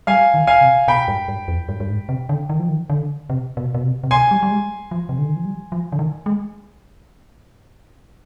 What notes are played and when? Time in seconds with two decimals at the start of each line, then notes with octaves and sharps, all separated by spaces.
0.07 G3 F5 G#5
0.34 D#3
0.47 F5 G#5
0.61 C3
0.88 B2 G5 B5
1.08 G2
1.28 G2
1.48 F2
1.69 G2
1.80 G2
1.89 G#2
2.09 C3
2.29 D3
2.50 D#3
2.59 F3
2.69 D#3
2.90 D3
3.30 C3
3.57 B2
3.75 B2
3.84 C3
4.04 C3
4.11 B2 G#5 C6
4.31 G3
4.43 G3
4.51 G#3
4.91 F3
5.09 C3
5.18 D3
5.27 D#3
5.36 F3
5.45 G3
5.72 F3
5.92 D3
5.99 D#3
6.26 G#3